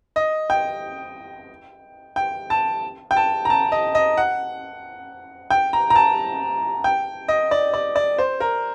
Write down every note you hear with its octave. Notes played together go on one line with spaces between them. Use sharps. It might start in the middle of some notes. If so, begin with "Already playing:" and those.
D#5
G5
G5
A5
G5
A5
A#5
A5
D#5
D#5
F#5
G5
A#5
A#5
A5
G5
D#5
D5
D5
D5
C5
A#4